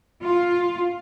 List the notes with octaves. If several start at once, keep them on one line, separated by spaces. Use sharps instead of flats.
F4